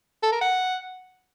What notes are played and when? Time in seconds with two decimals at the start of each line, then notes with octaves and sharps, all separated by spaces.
0.23 A4
0.32 A#4
0.41 F#5